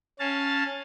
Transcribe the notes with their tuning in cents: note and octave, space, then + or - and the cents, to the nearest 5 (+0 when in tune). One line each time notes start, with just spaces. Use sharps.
C#4 +0 F5 +10 A5 +0